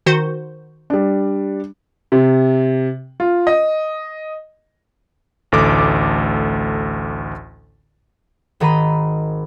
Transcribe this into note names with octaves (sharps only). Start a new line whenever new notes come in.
D#3 F#4 C5
G3 D4
C3
F4
D#5
A1 D2 A4 D6
G#1 D#3 D#5 A#5 B5 D#7